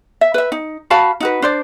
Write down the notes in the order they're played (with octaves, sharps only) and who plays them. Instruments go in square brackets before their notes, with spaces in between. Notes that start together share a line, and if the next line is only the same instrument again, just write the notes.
[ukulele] E5
B4 E5
D#4
F#4 F5 A5 B5
D#4 F#4 B4
D4 C5 D5